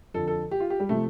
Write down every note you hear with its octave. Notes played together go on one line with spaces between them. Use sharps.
F2 D3 F3 A4
A4
G4
F4
G4
G3
C3 F3 A3